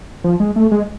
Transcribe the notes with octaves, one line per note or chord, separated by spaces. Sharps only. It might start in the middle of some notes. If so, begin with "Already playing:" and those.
F3
G#3
A3
G#3